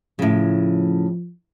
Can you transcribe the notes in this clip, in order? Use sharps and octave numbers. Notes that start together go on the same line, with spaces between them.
A2 C#3 F3